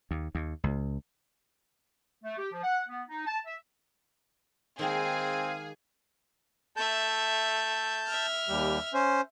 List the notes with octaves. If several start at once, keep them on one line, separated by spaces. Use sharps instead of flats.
D#2
D#2
C#2
A3
G4
F3
F#5
B3
D#4
A5
E5
D#3 G#3 A#3 C4 G#4 F5
A3 E5 A5 G6
E5 F6
D#2 G3
C#4 C5